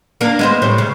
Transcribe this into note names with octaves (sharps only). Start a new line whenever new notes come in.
A#3 D4
G#3 B3 C5
A2 G3 C5
C#3